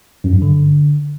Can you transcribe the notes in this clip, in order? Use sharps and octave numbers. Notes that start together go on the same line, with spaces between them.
F#2
G2
D3